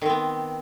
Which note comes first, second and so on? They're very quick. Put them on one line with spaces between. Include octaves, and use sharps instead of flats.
D#3 C4 B3